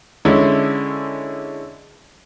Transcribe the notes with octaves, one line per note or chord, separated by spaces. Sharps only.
D3 G#3 C#4 E4